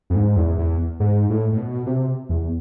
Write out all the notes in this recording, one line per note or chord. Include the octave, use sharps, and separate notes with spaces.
F2
G#2
E2
E2
G#2
A2
A2
B2
C3
E2